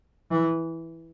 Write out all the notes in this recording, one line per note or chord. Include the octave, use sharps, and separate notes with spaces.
E3